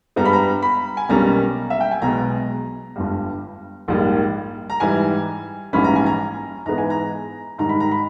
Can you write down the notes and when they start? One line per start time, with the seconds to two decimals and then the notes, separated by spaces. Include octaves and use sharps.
0.16 G2 G3 B3 A#5
0.25 B5
0.33 A#5
0.62 B5
0.97 G#5
1.09 B1 B2 G3 A#3 C#4 A#5
1.70 E5
1.80 G5
1.91 G#5
2.02 B1 B2 G#3 A#5
2.96 G1 G2 G3
3.88 A#1 G#2 G3 A#3
4.70 A#5
4.80 G#2 E3 G3 G#5
5.73 A#1 G#2 E3 G3 C#4 B5
5.84 A#5
5.96 G#5
6.06 A#5
6.65 G#2 E3 G#3 B3 A#5
6.78 G#5
6.90 A#5
7.58 G#2 D#3 G3 A#5
7.69 B5
7.80 A#5
7.92 B5